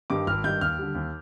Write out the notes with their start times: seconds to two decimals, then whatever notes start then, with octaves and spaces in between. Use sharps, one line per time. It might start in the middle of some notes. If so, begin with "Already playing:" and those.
0.10 G2 D#3 G3 D6
0.27 G#1 F6
0.44 G2 D#3 G3 G6
0.61 D#2 F6
0.78 D3 G3
0.95 D#2